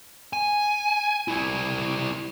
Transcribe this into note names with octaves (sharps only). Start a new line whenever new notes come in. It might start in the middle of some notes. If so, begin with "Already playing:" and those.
G#5
G3 E4